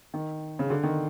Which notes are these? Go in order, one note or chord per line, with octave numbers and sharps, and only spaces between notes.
D#3
C#3
D3
D#3